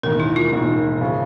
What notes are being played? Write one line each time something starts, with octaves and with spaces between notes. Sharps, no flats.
E1 D#2 D#3 A#4
E4
F4
E1 D#2 D#3
C#3 F3